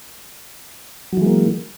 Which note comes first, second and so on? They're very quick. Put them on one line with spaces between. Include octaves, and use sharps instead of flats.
F#3 E3 G#3 A#3